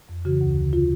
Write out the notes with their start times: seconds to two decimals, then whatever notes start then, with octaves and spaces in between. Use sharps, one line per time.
0.09 F2
0.25 C#3 E3 F#4
0.41 D2
0.57 D3
0.73 F4